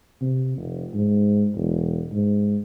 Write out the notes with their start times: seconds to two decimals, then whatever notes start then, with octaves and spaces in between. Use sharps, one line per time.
0.21 C3
0.57 F1
0.94 G#2
1.55 E1
2.12 G#2